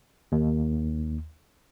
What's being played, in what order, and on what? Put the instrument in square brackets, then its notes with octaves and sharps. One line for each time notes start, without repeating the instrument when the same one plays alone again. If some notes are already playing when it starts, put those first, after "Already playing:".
[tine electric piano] D#2